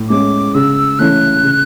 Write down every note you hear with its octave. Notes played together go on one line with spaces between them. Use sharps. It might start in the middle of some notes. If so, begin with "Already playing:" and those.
Already playing: A2
G#3 C#4 D6
C#3 E6
E3 A3 C#4 E4 F#6
C#3